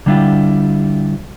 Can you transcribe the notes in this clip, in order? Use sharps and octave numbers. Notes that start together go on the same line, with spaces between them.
D3 G3 D4 E4 F4 G4